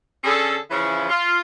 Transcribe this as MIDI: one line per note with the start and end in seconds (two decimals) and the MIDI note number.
0.24 0.57 50
0.24 0.57 61
0.24 0.57 68
0.24 0.57 69
0.71 1.08 49
0.71 1.08 52
0.71 1.08 53
0.71 1.08 61
0.71 1.08 64
0.71 1.08 65
1.10 1.40 65